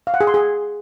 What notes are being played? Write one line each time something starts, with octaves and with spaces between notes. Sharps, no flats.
F5
F#5
G#4
C6
G#4